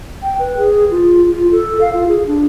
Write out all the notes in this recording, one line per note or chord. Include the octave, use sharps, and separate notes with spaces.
G5
B4
G#4
F4
F4
A4
F5
F4
G#4
D4